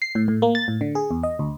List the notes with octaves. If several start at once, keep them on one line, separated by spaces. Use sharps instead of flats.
C7
A2
A2
A#3
A6
A2
D3
G#4
E2
D#5
D2